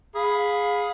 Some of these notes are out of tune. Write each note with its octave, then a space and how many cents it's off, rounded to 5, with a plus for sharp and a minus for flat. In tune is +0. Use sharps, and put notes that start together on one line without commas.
G#4 +0 F5 +30 B5 +0